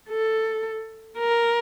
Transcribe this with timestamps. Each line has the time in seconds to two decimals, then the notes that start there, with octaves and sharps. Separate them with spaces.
0.09 A4
1.18 A#4